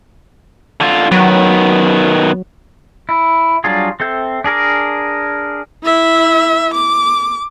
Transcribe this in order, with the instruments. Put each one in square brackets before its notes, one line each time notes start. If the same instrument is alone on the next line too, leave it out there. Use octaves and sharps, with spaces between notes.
[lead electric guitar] D3 F4
[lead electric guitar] D#3 B3 [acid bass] F#3
[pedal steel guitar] E4
F#3 G3 D4 F4 G#4
C4 A4 E5 G6
D4 G#4 A#4 D6
[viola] E4 E5
D6